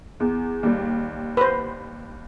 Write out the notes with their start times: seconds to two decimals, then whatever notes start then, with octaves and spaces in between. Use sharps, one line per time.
0.20 E2
0.63 D#2 G3
1.37 B4 C5